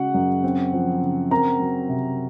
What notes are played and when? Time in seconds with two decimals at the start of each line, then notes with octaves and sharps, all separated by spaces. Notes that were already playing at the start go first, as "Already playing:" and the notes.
Already playing: C#3 G#3 F#4 F#5
0.14 F#2
0.44 C4
0.73 F3
1.02 C#3
1.31 C4 A#4 A#5
1.60 F#3
1.89 C3